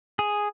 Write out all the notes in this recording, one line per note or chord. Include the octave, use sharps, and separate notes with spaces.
G#4